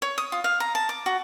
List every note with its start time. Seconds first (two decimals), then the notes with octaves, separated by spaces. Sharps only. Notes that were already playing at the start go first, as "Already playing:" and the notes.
0.02 C#5
0.18 D#6
0.32 F4
0.44 F5
0.60 A#5
0.75 A5
0.89 D6
1.06 F#4